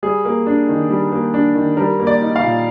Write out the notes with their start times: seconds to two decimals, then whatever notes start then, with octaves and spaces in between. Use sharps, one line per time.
0.03 G3 G#4
0.25 A#3
0.46 D4
0.69 D#3
0.90 G3
1.12 A#3
1.34 D4
1.55 D#3
1.77 G3 A#4
2.00 A#3
2.07 D5
2.21 D#4
2.36 F5
2.43 A#2